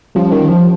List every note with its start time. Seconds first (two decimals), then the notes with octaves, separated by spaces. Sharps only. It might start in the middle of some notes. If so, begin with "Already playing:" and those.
0.15 F3 G3 C#4 G4
0.32 D#3
0.48 F3